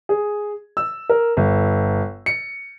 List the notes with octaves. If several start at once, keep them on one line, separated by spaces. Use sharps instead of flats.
G#4
E6
A#4
G1
C#7